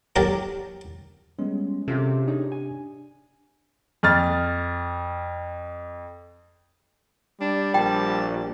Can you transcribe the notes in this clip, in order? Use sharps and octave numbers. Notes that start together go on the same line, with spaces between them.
F#3 G4 A4 A#4
G3 G#3 B3 C#4
C3 C4 C#4 F4 G#4 A4
D4 D#4 G#4 C#5
G#5
F2 F6 A6
G3 D4
A#1 G5 A5